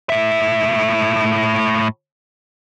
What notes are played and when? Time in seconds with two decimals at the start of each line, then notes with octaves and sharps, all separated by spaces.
0.10 A2 E5